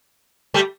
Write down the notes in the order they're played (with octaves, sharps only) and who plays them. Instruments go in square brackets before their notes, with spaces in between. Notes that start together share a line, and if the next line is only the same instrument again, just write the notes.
[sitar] G3 A3